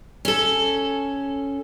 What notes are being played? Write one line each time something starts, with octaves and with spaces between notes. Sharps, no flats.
C#4 A4